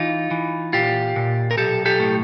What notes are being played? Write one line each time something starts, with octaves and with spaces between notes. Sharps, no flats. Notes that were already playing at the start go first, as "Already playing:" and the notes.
Already playing: E3 D#4 F4
E3
A#2 F4 G4
A#2
A#4
B1 G4 A4
G4 A4
A2